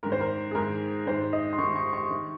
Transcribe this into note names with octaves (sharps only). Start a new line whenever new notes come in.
G#2 D#3 A#4
C5
A#4
G#4
G#2 D#3 A#4
G#2 D#3 C5
D#5
C6
G#2 D#3 C#6
C#6
C#6
D#3